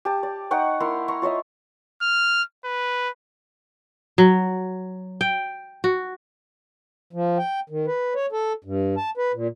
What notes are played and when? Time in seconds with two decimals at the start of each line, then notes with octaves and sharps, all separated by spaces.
0.05 G4 A5
0.23 D5
0.51 D#4 F#5 G5 C#6
0.80 A#3 E4 A#5 C6
1.08 A#5 C6 C#6
1.22 F4 C#5 D#5 E5
2.02 F6
2.65 B4
4.18 F#3
5.21 G5
5.84 F#4
7.13 F3
7.38 G5
7.70 D#3
7.86 B4
8.15 C#5
8.32 A4
8.64 G2
8.97 A5
9.17 B4
9.34 A#2